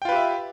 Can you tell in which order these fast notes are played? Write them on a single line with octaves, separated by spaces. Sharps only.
G5 F4 B4 G4 E5